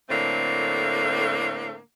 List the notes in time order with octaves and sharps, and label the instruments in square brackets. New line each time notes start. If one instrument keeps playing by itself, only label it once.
[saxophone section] A2 D3 A3 A#3 C4